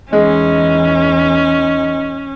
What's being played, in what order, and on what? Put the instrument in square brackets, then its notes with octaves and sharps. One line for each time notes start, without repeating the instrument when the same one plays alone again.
[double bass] E2 E3 [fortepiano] G#3 [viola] C#4 [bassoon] D#4